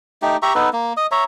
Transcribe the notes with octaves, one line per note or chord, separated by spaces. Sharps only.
A3 D#4 G4
G4 E5 A#5 C#6
B3 D#4 A4 B4
A#3
D#5 D#6
C#5 E5 A#5